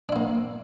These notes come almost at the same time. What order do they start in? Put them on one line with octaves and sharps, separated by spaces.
D4 E4 A#3